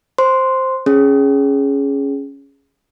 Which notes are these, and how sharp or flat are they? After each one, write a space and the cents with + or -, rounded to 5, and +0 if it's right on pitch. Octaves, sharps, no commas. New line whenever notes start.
C5 +0 C6 -5
C#4 +0 G#4 +0